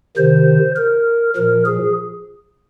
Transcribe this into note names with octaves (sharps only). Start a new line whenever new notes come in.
C3 D#3 C5
A#4
A#2 F3 A#4
G#4